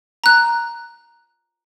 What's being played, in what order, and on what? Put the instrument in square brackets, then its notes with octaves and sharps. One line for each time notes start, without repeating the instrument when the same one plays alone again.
[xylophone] A#5 F#6